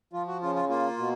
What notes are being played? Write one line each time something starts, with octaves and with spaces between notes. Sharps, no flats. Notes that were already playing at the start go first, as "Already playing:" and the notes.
F3 F4
F#4
C#3 F4
F4
A#3 F4
B2